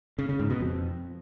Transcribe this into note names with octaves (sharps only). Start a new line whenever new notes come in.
C#3
C#3
G#2
B2
F2